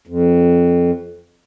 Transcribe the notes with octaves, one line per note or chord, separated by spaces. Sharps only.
F2